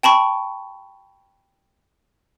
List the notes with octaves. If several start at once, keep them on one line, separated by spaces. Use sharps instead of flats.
G5 A5 B5 C#6